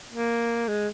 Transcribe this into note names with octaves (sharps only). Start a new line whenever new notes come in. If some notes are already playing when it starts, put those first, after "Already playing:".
A#3
G#3